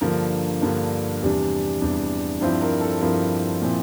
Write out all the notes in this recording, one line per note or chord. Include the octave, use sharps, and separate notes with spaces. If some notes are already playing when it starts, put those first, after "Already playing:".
G2 D3 F3 A#3 A#4
G2 D3 F3 A#3
E2 C3 G3 D4
E2 C3 G3 D4
G2 F3 C4 E4 C5
A#4
A4
G2 F3 C4 E4 A#4
A#2 F3 C4 E4